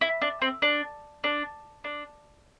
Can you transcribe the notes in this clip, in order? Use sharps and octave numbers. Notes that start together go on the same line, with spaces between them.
E4
D4
C4
D4
D4
D4